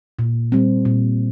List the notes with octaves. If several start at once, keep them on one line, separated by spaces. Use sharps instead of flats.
A#2
G3 C4
A#2